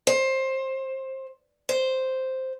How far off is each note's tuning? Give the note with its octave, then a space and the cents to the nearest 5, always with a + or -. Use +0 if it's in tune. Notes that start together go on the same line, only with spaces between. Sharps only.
C5 +20
C5 -5